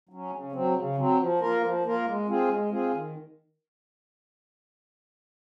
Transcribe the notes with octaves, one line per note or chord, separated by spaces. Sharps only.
F#3 C#4
C#3
F#3 C4
C#3
F#3 C4
F3
A#3 F4 A#4
F3
A#3 F4 A#4
G#3
C4 F4 G#4
G#3
C4 F4 G#4
D#3